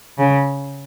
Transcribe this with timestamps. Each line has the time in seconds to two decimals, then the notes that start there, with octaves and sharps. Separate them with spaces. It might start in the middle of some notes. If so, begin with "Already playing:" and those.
0.18 C#3